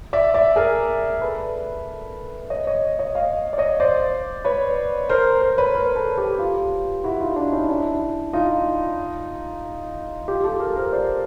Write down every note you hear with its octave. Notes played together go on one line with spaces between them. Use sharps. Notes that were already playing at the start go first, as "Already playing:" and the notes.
D5 E5
D5 E5
G#4 A#4
A4 B4
C#5 D#5
C#5 D#5
C#5 D#5
D#5 F5
D5
C#5 D#5
C5 D5
B4 C#5
A#4 C5
A#4 C5
B4 C#5
A#4 C5
A4 B4
G4 A4
F4 G4
E4 F#4
D#4 F4
D4 E4
C#4 D#4
D4 E4
D#4 F4
F4 G4
G4 A4
G#4 A#4
A#4 C5
C5 D5